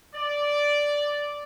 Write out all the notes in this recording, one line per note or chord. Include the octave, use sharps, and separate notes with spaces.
D5